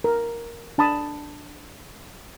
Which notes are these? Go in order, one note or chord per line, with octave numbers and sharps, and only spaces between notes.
A#4
D4 A5 B5 D#6